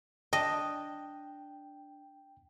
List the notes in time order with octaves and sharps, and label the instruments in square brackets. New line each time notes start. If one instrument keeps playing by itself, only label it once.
[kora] D4 [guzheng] D#5 [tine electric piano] G5